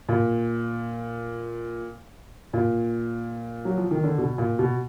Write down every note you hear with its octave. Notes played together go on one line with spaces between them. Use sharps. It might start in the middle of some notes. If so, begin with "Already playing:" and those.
A#2
A#2
F#3
F3
D#3
D3
B2
A#2
B2